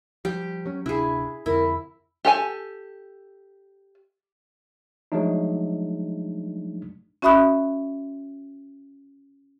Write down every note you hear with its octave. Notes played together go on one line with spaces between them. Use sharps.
F3 G3 G4
F#3 C#4
D1 C3 D4 E4 G#4
F2 D3 E4 A#4
G4 A4 G#5
F3 F#3 G#3 A3 D4 D#4
C#4 F#4 E5 B5 D#6 F#6